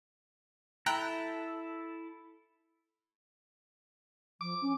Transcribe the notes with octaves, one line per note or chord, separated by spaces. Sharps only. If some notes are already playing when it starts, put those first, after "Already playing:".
E4 A4 G5 A#5 F#6
F3 D6
C#4